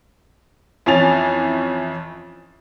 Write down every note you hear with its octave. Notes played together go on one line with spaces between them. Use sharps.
F2 E3 C#4 G#5 A6 F7